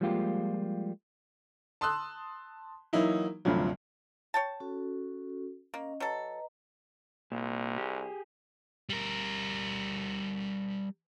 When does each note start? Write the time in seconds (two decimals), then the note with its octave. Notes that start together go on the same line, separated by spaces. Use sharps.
0.01 F3 G3 G#3 A#3 F4 G4
1.81 A5 C6 D#6 E6 F#6
2.93 E3 F#3 A#3 D#4 E4
3.45 G1 D2 G2 C3 F3 F#3
4.34 C#5 G5 A5
4.60 C#4 F#4 A4
5.74 A#3 C#4 D#5
6.00 F#3 A4 B4 D#5 A#5
7.32 C2 A#2
7.78 G4 G#4
8.89 G3 A#4